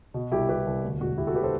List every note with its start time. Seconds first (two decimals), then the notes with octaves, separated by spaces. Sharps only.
0.14 B2
0.31 C2 E4 G4
0.49 B2 G4 B4
0.66 C2
0.84 D2
1.01 E1 F#4
1.18 E1 E4 G4
1.27 F#4 A4
1.35 D3 G4 B4
1.43 A4 C5